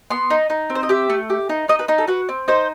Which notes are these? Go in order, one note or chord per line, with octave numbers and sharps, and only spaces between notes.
B3 C6
D#4
D#4
C4
C5
D#5
G4 E5
A3
G4
D#4
D#4 D#5
B4
D#4
A4
F#4 B4
C4
D#4 C5